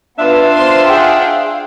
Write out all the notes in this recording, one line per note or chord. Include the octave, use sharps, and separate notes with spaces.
B3 D4 F4 E5
C5 C6
G#4 F#5 G5
F5